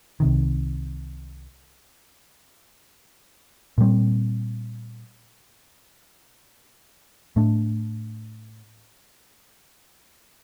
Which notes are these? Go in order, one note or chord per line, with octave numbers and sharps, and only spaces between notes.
C2 C3 D#3
A#2 G3 C4
A2 A3 D4